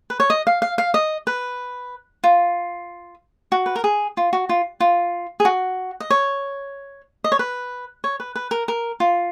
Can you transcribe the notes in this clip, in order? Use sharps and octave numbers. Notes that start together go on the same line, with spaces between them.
B4
C#5
D#5
F5
F5
F5
D#5
B4
F4
F#4
B4
A#4
G#4
F4
F#4
F4
F4
G#4
F#4
D#5
C#5
D#5
C#5
B4
C#5
B4
B4
A#4
A#4
F4